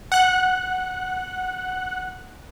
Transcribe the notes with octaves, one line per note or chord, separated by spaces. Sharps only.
F#5 F#6